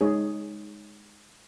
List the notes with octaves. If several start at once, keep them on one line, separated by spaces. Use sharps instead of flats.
G#3 D#4 G#4 C#5